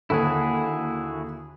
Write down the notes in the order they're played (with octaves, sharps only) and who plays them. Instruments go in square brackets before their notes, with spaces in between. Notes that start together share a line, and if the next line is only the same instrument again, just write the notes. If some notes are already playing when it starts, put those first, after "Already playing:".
[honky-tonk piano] D#2 D3 A4 [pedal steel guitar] E4 F#4 G#4